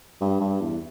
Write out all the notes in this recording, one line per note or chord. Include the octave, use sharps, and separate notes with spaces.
G2
G2
E2